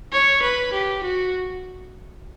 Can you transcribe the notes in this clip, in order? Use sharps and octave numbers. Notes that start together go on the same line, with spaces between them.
C#5
B4
G4
F#4